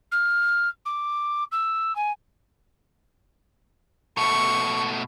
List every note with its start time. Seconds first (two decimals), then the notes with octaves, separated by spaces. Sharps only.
0.12 F6
0.85 D6
1.52 E6
1.95 G#5
4.17 B2 A3 C#6